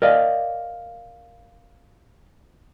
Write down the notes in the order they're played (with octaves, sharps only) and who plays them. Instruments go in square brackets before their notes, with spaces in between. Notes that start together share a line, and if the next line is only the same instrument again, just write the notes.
[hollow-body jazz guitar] A#4 D5 D#5 F5